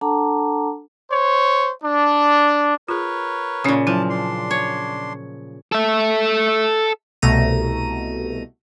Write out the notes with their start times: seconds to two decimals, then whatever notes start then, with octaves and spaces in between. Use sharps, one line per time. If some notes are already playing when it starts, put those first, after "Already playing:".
0.01 D4 A4 F#5 A5 A#5 D6
1.11 C5 C#5
1.83 D4
2.89 F4 G#4 A#4 B4 C#5
3.64 A#2 C#3 C#4 D#6
3.87 F3 F#3 E4 A5
4.10 D4 C6
4.51 C#5
5.72 A4 E5
7.22 C2 B2 A3 A#5 D#7